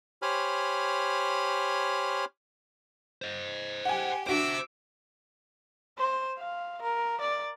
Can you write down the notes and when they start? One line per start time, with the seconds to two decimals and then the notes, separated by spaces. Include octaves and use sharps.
0.22 G4 C5 C#5 G#5 B5 F6
3.22 C5 D#5
3.85 G4 F#5 G#5
4.27 D4 F#4 C5 E5 D6 E6 D7
5.98 C5
6.38 F5
6.82 A#4
7.21 D5